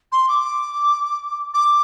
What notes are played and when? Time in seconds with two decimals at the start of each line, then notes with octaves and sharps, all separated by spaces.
0.12 C6
0.28 D6
1.54 D6